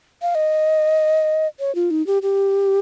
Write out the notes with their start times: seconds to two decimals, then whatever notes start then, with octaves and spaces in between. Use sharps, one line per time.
0.22 F5
0.35 D#5
1.60 C#5
1.75 F4
1.91 D#4
2.07 G4
2.22 G4